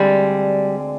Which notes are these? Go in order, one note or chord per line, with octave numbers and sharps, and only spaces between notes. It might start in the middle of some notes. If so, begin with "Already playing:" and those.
Already playing: D2 D3 G3 G#3 C4